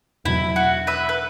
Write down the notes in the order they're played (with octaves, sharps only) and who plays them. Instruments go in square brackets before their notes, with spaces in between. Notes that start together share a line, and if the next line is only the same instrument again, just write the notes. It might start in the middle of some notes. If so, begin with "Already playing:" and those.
[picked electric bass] E2 B2 F#3 [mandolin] E4
[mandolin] F#4
B4 E5
B4